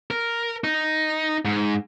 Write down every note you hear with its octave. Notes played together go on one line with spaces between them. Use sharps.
A#4
D#4
G#2